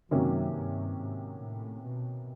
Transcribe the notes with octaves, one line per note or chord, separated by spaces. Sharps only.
F#2 C3 D#3 F#3 A#3 C#4
G2
G#2
A2
B2